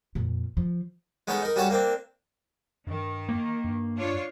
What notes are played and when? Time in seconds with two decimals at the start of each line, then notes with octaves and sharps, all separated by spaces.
0.15 F2 A#2
0.57 F3
1.27 G#3 B3 C#4 D#4 A4
1.42 D#4 A#4
1.56 G3 C#4 F#4 A4 C#5 A5
1.70 A#3 C4 D4
2.87 G2 D#3
3.29 A#3
3.64 G2
3.97 D4 F4 C#5